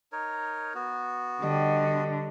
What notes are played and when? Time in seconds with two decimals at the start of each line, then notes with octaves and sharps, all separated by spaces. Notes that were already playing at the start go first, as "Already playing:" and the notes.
0.12 D#4 A#4 C#5
0.75 B3 F#4
1.42 D3 G3 D#5